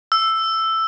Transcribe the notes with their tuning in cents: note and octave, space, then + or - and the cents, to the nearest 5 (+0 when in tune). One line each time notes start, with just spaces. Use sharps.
E6 +5